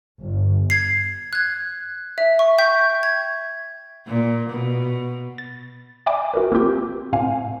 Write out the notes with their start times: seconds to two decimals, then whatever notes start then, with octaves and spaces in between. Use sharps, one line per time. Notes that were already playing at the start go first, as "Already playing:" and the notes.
0.19 G1
0.70 G#6 C7
1.33 F#6 G#6
2.18 E5
2.39 C#6
2.58 G5 C#6 G6 B6
3.03 G#6
4.08 A#2
4.50 B2
5.38 A6
6.06 D5 E5 G5 G#5 B5 D6
6.34 F#4 A#4 B4
6.52 A#3 C4 F4 G4 G5
7.13 A2 C4 F5 G#5